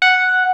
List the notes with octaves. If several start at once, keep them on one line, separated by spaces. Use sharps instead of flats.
F#5